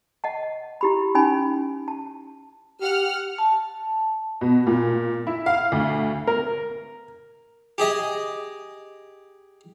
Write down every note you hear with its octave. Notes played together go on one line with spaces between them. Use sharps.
D#5 F#5 A5
E4 G4 B5
C#4 D#4 G#5 B5
A5
G4 F#5 F6
A5
B2
A#2
E4
F5
D2
A#4
G4 G#4 D#5